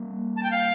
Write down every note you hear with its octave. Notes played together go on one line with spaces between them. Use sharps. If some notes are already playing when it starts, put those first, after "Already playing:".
Already playing: G3 A#3
A5
G5
F5